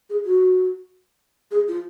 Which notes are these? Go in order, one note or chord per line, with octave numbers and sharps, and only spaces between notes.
G#4
F#4
G#4
F4